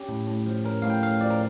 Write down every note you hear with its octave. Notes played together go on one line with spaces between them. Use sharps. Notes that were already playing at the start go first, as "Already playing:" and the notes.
Already playing: C#4 G4
A2
A2
F3
C#4 A#4
A2 F5
G5
A2 F5
F3 D5
A#4